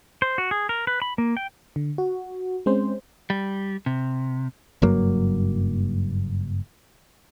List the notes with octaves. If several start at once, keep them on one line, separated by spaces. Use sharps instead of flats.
C5
F#4
G#4
A#4
B4
B5
A#3
G5
D3
F#4
G#3 C4 C#4 C5
G3
C3
F#1 G2 F#3 A#3